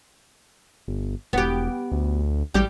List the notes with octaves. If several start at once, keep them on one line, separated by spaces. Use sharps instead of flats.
G1
E1 B3 G4
D2
A1 G3 G4